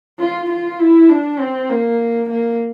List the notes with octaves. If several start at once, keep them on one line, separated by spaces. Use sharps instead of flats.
F4
F4
E4
D4
C4
A#3
A#3